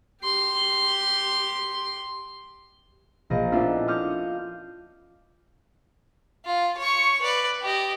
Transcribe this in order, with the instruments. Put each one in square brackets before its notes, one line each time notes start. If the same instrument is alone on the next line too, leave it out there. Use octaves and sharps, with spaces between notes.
[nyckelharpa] G4 C6
[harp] A#1 A#3 D#5 D7
A3 B3 C#4 D4 E4 F4
C6 D6 D#6 F6 G6 C#7
D#6
[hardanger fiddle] F4
C#5 C#6
B4 D5
G4 D#5